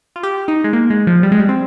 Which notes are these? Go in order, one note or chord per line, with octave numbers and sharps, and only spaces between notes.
F4
G4
D#4
G#3
A#3
G#3
F3
G3
G#3
G3
C4